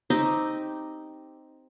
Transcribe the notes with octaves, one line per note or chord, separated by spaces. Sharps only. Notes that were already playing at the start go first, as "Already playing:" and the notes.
C4 D#4 G4 D#5